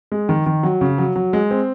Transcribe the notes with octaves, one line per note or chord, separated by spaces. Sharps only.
G#3
D#3
D#3
F#3
C#3
F#3
F#3
G#3
C4